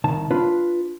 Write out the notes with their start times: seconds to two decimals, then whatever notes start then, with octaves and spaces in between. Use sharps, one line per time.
0.04 C2 D#3 A5
0.31 D4 F4 B4